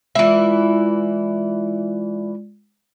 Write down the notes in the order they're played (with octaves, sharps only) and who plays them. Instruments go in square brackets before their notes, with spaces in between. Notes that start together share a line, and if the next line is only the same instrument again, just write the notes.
[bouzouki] E3 E4 [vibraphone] G#3 F4 D5